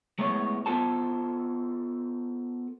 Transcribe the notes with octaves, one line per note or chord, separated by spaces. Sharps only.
G#3 A3 B3 E4 C5 C#5
B3 F4 A4 C5 A5